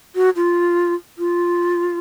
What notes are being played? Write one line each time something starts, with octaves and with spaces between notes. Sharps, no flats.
F#4
F4
F4